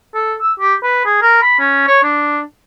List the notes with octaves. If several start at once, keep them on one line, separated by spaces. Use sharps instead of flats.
A4
E6
G4
B4
G#4
A#4
B5
C#4
C#5
D4